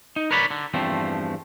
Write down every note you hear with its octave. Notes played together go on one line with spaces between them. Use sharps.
D#4
A#4 B4 C#5 D5 A5 B5
D3
E2 G2 F3 A3 C4